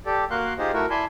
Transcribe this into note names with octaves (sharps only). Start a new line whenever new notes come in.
G4 A4 D5
A#3 F#4 A#4 F5 C6 F#6
D#4 F4 G4 G#4 C5 D#5
A3 E4 F#4 A#4
E4 D5 G#5 A5 B5 C6